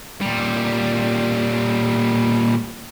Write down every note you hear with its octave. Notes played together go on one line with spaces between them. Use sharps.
A#2 G3